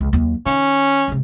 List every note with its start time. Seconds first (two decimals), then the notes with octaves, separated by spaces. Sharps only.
0.01 C#2
0.13 D#2 F#3
0.46 D#3 C#4
1.08 G#2 C3